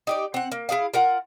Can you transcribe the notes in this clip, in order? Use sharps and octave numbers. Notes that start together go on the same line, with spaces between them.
D#4 G4 D5
C4 F#5
A#3
E4 G4 G#4 F5
F4 A#4 F#5